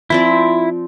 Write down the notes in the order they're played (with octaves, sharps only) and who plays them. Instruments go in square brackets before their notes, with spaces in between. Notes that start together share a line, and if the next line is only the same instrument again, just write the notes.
[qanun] F3 C4 D5 [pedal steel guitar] E4